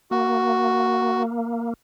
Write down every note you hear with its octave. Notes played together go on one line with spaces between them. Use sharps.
A#3 F#4